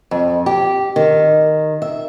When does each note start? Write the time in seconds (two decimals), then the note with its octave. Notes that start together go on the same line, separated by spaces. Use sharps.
0.11 F2
0.46 G4
0.96 D#3
1.82 E5